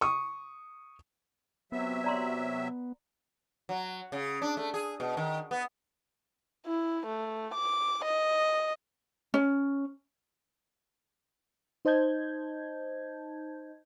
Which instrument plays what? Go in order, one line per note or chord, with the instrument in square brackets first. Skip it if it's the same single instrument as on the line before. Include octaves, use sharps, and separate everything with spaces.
[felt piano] C#6 D#6
[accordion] C3 F#3 E5 [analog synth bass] B3
[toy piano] D5 A#5 C6
[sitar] F#3
C#3
D4
A3
G#4
B2
D#3
B3
[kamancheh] E4
A3
D6
D#5
[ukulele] C#4
[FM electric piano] D#4 C5 D#5 A5 G6 G#6